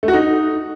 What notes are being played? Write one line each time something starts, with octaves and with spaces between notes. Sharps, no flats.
A3
F#4
D#4